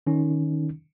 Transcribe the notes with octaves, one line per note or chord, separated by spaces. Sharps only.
D#3 C#4 D#4